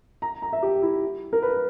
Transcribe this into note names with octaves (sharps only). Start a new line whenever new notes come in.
A#5
A#5
E5
G4
E4
A#4
B4